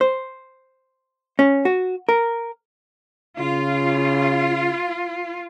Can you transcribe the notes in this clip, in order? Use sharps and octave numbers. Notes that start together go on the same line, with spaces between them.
C5
C#4
F#4
A#4
C#3 F4